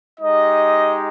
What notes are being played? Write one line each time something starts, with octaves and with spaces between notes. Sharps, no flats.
G#3 D#4 G4 D#5